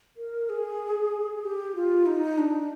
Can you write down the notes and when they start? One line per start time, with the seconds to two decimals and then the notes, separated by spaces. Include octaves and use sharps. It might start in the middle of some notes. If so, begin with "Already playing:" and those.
0.17 A#4
0.49 G#4
1.43 G4
1.75 F4
2.06 D#4
2.38 D4